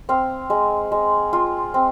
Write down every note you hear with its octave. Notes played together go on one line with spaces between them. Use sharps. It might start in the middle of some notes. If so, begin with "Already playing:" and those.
C4 F5
G#3
G#3
F4
C4